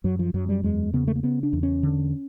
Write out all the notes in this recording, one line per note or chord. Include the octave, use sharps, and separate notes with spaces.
F#2 F#3
F3
F#2 F#3
G3
E2 G#3
C#3 B3
A3
A#3
C#3 B3
D4
E2
C#4
D3